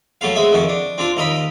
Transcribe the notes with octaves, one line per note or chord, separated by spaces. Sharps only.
F#3 A3 B3 F5
G#3 C4 D#5 E5
F2 D#3 F#4
D4
C4 D4 F4
D#2 A#4 D#5 B5